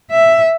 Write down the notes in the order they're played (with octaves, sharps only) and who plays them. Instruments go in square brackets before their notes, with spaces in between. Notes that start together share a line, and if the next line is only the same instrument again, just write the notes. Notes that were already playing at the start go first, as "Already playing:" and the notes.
[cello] E5